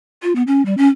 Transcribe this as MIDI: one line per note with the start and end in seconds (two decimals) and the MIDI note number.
0.23 0.35 65
0.36 0.43 59
0.47 0.64 61
0.66 0.77 55
0.78 0.88 61